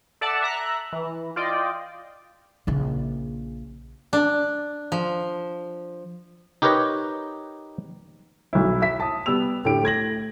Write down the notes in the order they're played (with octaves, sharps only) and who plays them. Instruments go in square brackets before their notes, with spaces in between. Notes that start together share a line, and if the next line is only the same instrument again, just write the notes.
[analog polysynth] A4 D5 E5 F#5 A5
E5 A#5 F#6
E3
F4 D5 D#5 G5
[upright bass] A#1 C#3
[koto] D4
F3
[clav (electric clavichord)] D#4 G4 A#4 B4 C#5 D#5
[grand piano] B1 E4
E5 B6
A5 D#6
G3 B3 E6 F7
A2 D3 G4 D7
A3 G#6 A#6 F#7